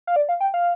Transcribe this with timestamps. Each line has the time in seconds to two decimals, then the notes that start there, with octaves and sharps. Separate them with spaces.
0.07 F5
0.16 D5
0.29 F5
0.41 G5
0.54 F5